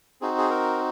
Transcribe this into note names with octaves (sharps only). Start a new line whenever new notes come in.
C4 D#4 F#4 G#4
G#4
A#4